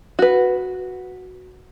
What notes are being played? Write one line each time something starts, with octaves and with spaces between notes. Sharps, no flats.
F#4 B4